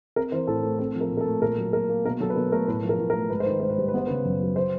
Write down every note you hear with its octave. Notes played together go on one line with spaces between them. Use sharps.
C4 A#4
E3 C5
A2 A4
A3
C4 A4
F3
A#4
A#2
A#4
A4
A3
A#2 A#4
F#3
A#2 A#4
A#3
B2 A#4
F#3 A4
B4
B2 A#4
A3 A#4
A2 B4
F3
A#4
A2
A#4
A3
G#2 B4
C5
D#3 B4
G#2 C5
B4
G3 C5
B4
B3 C5
C#3 B4
F#2
F#3
C5